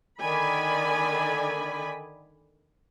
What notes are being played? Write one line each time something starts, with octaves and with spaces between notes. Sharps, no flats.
D3 D#3 D5 G#5 B5